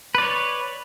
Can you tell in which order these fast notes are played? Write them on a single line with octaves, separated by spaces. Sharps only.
B4 D5 C#5